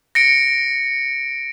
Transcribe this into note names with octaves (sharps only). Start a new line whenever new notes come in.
A#6 C#7 D7